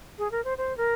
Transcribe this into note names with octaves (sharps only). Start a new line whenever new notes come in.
G#4
A#4
C5
C5
A#4